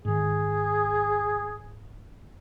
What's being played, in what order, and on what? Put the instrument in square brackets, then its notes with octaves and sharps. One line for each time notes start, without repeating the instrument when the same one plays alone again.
[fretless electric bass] G#2 D#3 [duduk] G#4